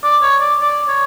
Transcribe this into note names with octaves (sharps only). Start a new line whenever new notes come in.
D5
C#5
D5
D5
C#5